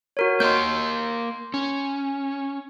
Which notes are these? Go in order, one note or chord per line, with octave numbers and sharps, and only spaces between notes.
F#4 A#4 C#5
A#3 A#4 D#5 C6 G6
C#4